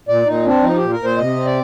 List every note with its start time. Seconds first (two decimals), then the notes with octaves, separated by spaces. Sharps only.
0.08 A#2 D5
0.26 A#2 D#4
0.45 C4 D4
0.63 F3 D#4
0.77 A#2 G4
0.91 A#4
0.99 A#2
1.04 C5
1.17 C3 D#5
1.36 C4
1.46 D5